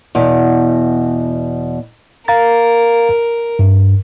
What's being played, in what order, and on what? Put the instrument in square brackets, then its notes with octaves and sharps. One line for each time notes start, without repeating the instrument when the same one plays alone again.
[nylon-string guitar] E2 B2
[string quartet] A#4 [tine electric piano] F5 A#5 A6
[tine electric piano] G2